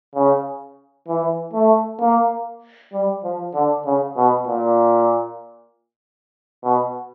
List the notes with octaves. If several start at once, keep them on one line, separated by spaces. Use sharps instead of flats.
C#3
E3
A3
A#3
G3
F3
D3
C#3
B2
A#2
B2